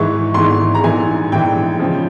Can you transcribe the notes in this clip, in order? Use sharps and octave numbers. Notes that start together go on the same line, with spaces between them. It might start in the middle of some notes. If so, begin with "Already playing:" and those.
Already playing: G#1 G#2 E3 G#3 C#6
G#1 G#2 E3 G#3 C6
A#5
A#1 G#2 E3 G#5
A#1 G#2 E3 G5
C#3 F3